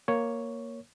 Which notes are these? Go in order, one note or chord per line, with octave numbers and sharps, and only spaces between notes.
A#3 C#5